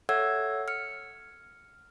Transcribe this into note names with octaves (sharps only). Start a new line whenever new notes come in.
A4 C#5 E5 F#5 E6 G#6
F6 C#7